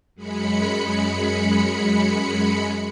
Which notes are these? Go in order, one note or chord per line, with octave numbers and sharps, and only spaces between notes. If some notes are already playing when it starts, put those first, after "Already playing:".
F#2 G#3 B5 C#7